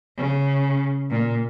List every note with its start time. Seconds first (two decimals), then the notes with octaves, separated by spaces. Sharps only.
0.17 C#3
1.10 A#2